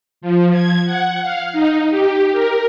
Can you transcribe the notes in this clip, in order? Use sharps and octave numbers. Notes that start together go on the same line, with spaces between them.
F3
G#6
F#5
F5
D#4
G4
A#4